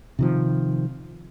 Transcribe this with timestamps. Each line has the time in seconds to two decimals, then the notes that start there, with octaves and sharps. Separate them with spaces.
0.19 C3 D#3 F3